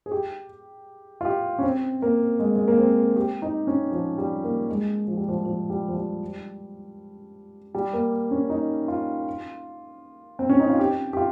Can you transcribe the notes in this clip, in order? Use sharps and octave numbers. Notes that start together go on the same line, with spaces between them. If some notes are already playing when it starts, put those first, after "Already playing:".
G#4
G4
F4
G4
C#4
C4
A#3
G#3
G#3
A#3
C4
G4
D#4
C#4
F3
G3
A#3
G#3
F3
G3
F3
F3
G3
F3
G3
G3
A#3
C#4
D#4
F4
C4
C#4
D#4
F4
G4
G4
F4